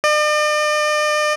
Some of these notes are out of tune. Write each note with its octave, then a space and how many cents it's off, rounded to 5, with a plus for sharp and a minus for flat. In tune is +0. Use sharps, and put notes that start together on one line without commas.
D5 +45